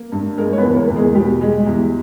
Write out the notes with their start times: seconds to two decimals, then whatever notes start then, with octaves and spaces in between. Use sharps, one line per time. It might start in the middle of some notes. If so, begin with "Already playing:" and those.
Already playing: A#3
0.12 G2
0.37 G#3 A#3 A#4
0.53 C#5
0.58 B3 B4
0.64 E2
0.76 A#3 A#4
0.89 E2
0.96 G#3 G#4
1.15 B2 G3 G4
1.41 G#3
1.66 E2